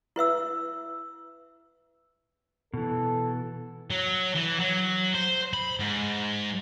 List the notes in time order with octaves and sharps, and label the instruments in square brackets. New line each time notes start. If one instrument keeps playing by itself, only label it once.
[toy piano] E4 B4 E5 E6
[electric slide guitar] B2 E3 [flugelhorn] A4
[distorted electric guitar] F#3
E3
F#3
C5
B5
G#2